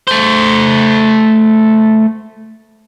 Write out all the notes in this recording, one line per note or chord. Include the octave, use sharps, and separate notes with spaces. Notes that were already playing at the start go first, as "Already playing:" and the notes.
A3 C5